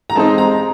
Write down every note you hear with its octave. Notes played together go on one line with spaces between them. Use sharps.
A#5
G#3 C4 D#4 A5
A#5